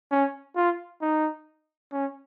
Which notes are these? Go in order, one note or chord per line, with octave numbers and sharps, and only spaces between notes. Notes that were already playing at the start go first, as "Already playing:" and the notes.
C#4
F4
D#4
C#4